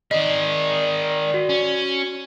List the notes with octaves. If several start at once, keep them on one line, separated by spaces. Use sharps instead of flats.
D#3 G#4 D5 D#5
F#4
C#4